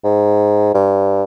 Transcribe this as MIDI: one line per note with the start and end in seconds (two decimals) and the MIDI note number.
0.04 0.74 44
0.74 1.23 43